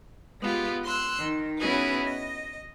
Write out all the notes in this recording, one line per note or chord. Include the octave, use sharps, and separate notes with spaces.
G#3 B3 F4 G4
C6 E6 F#6
D#3
B3 C#4 E4 F#4 G#4 B4
D#5